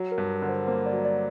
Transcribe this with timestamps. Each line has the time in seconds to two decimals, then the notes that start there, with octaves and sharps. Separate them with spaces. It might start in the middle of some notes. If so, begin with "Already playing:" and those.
Already playing: F#3
0.12 A#4
0.18 G2
0.42 D3
0.49 C5
0.67 A#3 C5
0.86 D5
0.92 F#3
1.05 D5